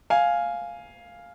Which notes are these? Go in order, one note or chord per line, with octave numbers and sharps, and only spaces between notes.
F5 G#5